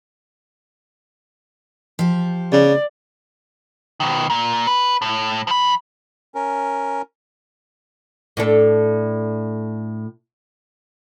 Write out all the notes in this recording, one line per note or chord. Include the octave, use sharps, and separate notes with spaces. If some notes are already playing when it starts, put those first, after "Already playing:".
F3 G4
C#3 D5
B2 D#3
A#2
B4
A2
F3 B5
C#4 A#4
A2 D4 A4